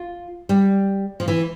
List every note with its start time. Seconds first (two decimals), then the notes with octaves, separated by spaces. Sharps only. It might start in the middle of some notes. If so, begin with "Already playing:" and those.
Already playing: F4
0.49 G3
1.20 F3
1.28 E3